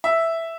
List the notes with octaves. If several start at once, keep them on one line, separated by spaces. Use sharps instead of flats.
E5